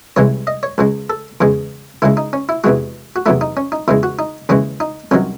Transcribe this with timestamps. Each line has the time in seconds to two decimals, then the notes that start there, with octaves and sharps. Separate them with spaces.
0.16 C2 C3 E3 G#3 C#5
0.47 D#5
0.63 C#5
0.78 C#2 C#3 G#3
1.10 A4
1.41 E2 C#3 G#3
2.02 C#2 C#3 G#3 E4
2.17 D#4
2.33 C#4
2.49 E4
2.64 E2 C3 E3 G#3 F#4
3.16 F#4
3.26 E2 C3 F#3 A3 E4
3.41 D#4
3.57 C#4
3.72 D#4
3.88 E2 C#3 G#3 E4
4.03 F#4
4.19 D#4
4.49 D#2 C#3 E3 G#3 C#4
4.80 D#4
5.11 C2 C3 D#3 F#3 C#4